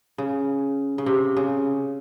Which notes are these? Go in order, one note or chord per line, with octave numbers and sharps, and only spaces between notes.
C#3
C#3
C3
C#3